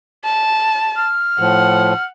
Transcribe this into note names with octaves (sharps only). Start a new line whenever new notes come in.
A5
F6
A2 F3 F#5